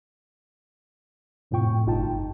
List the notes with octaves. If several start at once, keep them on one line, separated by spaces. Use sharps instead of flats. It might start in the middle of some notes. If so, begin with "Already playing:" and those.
F2 A2 C3 F4 G5 C#6
G1 D#4 F4 G5 A5